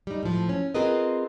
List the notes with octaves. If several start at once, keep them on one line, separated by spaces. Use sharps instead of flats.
G3 D#4
A2 F3
C#4
C4 F4 G#4 A#4 B4 D#5